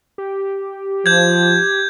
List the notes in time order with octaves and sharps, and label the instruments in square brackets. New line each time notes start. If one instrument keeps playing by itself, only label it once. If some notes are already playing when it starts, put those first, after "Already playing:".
[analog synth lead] G4
[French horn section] F3 [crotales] G6 G#6